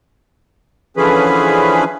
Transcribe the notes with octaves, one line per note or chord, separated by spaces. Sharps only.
D3 E3 F3 C#4 G#4 B4